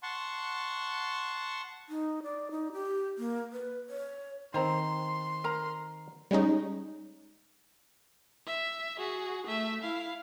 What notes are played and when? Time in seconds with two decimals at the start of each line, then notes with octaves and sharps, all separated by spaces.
0.03 F#5 A5 C6 C#6
1.89 D#4
2.23 D5
2.51 D#4
2.73 G4
3.18 A#3
3.52 B4
3.90 C#5
4.54 D#3 C4 C5 A#5 C6
5.44 A#4 A#5
6.31 G3 G#3 C#4 D#4
8.47 E5
8.99 F#4 G#4
9.47 A3 E5
9.81 E4 F5